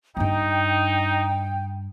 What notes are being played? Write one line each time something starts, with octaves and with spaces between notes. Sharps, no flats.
G2 D4 D#4 G5